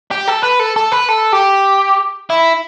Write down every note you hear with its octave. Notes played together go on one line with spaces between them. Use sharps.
G4
A4
B4
A4
A4
B4
A4
G4
E4